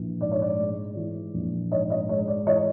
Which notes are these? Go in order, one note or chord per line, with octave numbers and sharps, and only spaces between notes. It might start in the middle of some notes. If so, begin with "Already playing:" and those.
Already playing: A#1 E3
G#2 D5
C#5
D5
G#3
E3
A#1
G#2 C#5 D#5
C#5 D#5
G#3 C#5
D5
E3 C#5 D#5